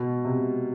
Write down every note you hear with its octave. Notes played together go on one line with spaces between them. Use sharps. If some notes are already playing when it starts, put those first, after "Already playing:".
Already playing: B2
C3